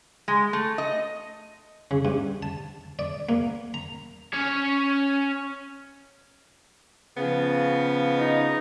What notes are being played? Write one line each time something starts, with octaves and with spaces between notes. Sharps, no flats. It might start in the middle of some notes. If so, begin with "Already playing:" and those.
G#3
A3
D#5
C#3
G2
A5
D5
A#3
A#5
C#4 C#5
C#3 F3 B3
D#4